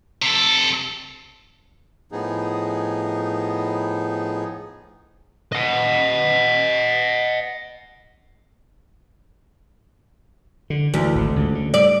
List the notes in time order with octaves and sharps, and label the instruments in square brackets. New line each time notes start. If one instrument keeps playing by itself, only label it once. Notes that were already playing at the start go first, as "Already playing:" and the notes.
[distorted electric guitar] C3 A4
[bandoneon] A2 F3 B3 D#4 G#4
[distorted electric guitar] D#5 F#5
[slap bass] D3
[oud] D2 [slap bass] E3
[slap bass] G#1 C3
C#2 C#3
D3
[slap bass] G3 [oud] D5